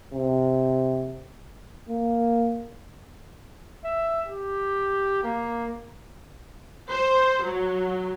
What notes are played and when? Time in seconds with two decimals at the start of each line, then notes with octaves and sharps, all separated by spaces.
0.14 C3
1.89 A#3
3.85 E5
4.27 G4
5.23 A#3
6.90 C5
7.43 F#3